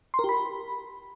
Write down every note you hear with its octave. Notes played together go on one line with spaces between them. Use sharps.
C6
A#4
G4
B5